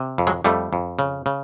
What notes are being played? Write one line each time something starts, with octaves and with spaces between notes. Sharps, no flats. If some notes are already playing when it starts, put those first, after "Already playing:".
Already playing: C3
F2
F#3 G#3
F2 G3 A3
F2
C#3
C#3